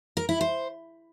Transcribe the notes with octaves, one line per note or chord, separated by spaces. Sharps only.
A#4
E4
C5